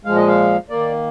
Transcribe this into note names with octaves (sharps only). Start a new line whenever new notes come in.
A#2 F3 G#3 F5
D#5
F5
D#3 A#3 D5